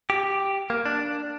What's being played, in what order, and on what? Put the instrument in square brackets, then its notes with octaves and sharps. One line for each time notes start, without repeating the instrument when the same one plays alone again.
[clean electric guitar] G4
A#3
D4